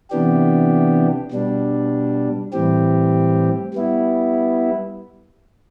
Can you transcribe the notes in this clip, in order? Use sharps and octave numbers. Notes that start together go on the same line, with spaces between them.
C3 E3 B3 D4 G4
B2 G3 D4
A2 E3 G3 C4 G4
G3 B3 E4